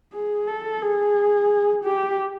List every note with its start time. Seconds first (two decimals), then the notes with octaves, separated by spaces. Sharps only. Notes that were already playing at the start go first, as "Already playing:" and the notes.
0.13 G#4
0.47 A4
0.81 G#4
1.84 G4